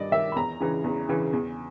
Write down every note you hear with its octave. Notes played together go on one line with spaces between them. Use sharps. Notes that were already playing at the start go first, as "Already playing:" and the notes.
Already playing: G2 D#3 D5 D#5
D#3 E5
B5
E2 A#5
C#3 E3
E2
C#3 E3
E2